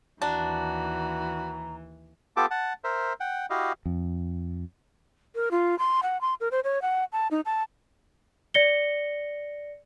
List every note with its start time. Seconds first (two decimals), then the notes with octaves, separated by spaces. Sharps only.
0.22 D#2 E3 D4 F#4 A#5
2.37 B3 F4 G4 A4 A5 D6
2.51 F#5 A5
2.84 A#4 C5 E5
3.20 F#5 G5
3.50 E4 F#4 G4 D#5 F5
3.86 F2
5.35 A#4
5.51 F4
5.79 C6
6.03 F#5
6.21 C6
6.40 A#4
6.51 C5
6.64 C#5
6.82 F#5
7.12 A5
7.31 D#4
7.46 A5
8.54 D5 A#6 C#7 G7